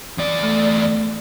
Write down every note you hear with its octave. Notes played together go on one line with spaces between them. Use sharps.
E2 D5
A3